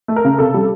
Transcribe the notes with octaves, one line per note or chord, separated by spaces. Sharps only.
A3
A#4
C#3
C3 A4
G3